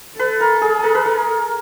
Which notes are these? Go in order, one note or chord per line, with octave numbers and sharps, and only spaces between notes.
A4 B4
A#4
G#4
A#4
B4
A#4